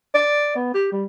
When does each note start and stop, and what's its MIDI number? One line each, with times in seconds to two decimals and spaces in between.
0.15 0.54 74
0.56 0.73 59
0.74 0.90 67
0.92 1.06 55